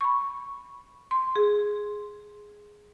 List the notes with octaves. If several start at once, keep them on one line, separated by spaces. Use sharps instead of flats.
B5 C#6
C6
G#4